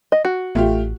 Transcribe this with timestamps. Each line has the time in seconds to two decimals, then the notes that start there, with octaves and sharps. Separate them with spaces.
0.12 D#5
0.25 F#4
0.55 A1 A3 F4 G4